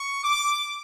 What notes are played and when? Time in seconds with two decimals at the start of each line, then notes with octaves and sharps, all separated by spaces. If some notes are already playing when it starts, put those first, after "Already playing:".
Already playing: C#6
0.24 D6